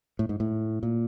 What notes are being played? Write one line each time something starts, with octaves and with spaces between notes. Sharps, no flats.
A2
G#2
A2
A#2